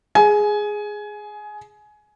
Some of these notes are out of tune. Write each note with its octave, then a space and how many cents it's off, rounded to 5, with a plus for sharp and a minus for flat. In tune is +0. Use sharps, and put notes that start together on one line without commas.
G#4 +0 G#5 +20